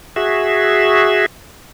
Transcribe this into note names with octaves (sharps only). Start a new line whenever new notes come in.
F#4 G#4 E5